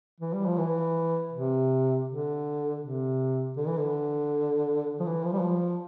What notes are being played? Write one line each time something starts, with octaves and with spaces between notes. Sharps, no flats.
E3
G3
F3
E3
C3
D3
C3
D3
E3
D3
F3
E3
F3
G3
F3